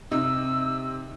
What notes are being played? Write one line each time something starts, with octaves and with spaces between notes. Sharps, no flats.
C3 D#4 E6